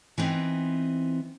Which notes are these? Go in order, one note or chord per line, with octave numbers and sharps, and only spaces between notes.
E3 B3 C4 D#4